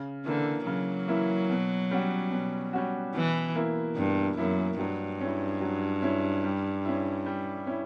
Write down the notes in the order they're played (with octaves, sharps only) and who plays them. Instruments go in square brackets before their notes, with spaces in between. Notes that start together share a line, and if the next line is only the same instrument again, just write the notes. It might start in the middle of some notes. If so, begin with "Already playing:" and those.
Already playing: [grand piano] C#3
[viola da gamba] D3 [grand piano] E3 A#3 E4
[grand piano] C#3 [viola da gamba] F#3
[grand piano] E3 A#3 E4
B2
G3 C#4 F#4
B2
G3 C#4 F#4
[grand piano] B2 [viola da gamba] E3
[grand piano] A#3 E4
[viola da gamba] G2 [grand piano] B2
[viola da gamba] F#2 [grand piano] A#3 E4
[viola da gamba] G2 [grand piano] F#3
[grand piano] C#4 E4
F#3
C#4 E4
G3
C#4 E4
G3
C#4 E4